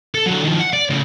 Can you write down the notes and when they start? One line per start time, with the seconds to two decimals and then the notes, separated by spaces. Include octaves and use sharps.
0.15 A4
0.26 D3 F#3
0.44 D#3 F3
0.60 F#5
0.73 D5
0.90 A2 C#3